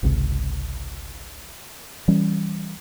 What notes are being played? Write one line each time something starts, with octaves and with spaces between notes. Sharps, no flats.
G#1 C#2 C3
E3 G3 C#4